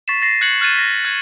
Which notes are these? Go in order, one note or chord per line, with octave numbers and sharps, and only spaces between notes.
C#6 A6 B6 C7 E7
A6 A#6 C7
F#6 G#6 C#7 F#7
F6 F#6 G#6 A6 D#7 E7
A#6 B6
F#6 G#6